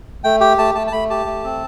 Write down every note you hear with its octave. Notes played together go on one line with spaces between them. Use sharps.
A3 G5
G4 G5
A3 A5
A3 A5
A5
A3 B5
G4 A5
A3
C4